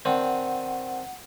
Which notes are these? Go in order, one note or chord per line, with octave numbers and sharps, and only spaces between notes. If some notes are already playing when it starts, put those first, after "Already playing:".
D#3 C4 D4 F#5